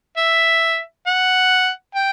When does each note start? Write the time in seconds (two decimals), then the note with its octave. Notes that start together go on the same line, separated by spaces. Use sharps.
0.17 E5
1.07 F#5
1.95 G5